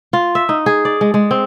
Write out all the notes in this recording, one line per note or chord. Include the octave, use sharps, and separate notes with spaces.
F4
E5
D#4
G#4
D5
G#3
G#3
C4